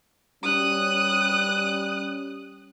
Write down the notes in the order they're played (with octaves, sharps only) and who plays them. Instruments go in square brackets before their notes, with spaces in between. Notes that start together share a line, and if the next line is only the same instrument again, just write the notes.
[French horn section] G3 C#4 [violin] D#6 F#6